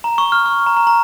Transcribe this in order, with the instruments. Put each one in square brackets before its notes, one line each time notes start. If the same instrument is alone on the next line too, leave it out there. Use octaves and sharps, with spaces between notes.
[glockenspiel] A#5
C#6
F6
C#6
A#5
A#5
A#5